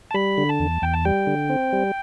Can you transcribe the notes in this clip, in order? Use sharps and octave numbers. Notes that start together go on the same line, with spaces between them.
A5
G3 B5
D3
A5
E2
E2 G5
A5
G3 G5
D3
C4
G3